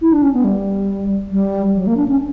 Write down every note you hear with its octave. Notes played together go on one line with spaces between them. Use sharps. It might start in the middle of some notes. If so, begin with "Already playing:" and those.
E4
D4
C#4
B3
G3
G3
F#3
A#3
D4
C#4